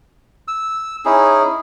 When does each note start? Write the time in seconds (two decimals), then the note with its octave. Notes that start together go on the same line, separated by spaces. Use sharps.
0.48 E6
1.05 C#4 D#4 E4 G#4